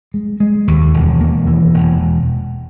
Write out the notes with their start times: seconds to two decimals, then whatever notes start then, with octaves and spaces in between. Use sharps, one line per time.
0.14 G#3
0.40 G#3
0.67 D#2
0.94 E1
1.21 A#3
1.47 E3
1.74 E1